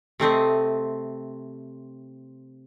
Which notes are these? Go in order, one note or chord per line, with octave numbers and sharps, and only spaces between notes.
C3 A3 C4 D#5